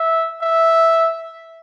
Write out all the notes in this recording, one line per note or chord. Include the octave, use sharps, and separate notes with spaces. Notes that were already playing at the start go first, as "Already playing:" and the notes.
Already playing: E5
E5